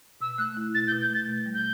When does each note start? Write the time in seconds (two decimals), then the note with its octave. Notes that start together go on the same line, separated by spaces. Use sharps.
0.21 B2 E6
0.38 A3 F#6
0.57 E4
0.75 B2 A6
0.88 G6
0.92 B2
1.01 G6
1.10 A3 A6
1.28 B2
1.46 G3
1.54 G6